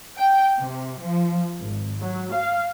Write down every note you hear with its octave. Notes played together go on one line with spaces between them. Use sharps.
G5
C3
F3
G#1
F#3
F5